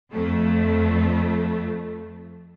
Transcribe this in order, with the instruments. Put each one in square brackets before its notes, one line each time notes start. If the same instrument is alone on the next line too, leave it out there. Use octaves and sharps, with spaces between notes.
[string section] F2 A3